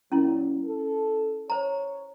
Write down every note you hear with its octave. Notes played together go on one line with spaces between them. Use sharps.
A#2 F#3 C#4 E4
A4
C5 C#5 A#5